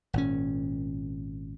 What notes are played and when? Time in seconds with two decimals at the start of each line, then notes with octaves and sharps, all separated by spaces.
0.13 G#1 A#2 C#4